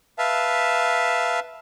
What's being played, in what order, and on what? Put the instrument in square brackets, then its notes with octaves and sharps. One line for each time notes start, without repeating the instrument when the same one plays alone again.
[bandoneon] B4 E5 F5 A5